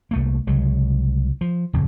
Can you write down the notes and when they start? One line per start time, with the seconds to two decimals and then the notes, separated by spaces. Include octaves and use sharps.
0.11 C2 A3 A#3
0.47 C2 C#3 F#3 G#3
1.41 F3
1.73 D1 F2 C#3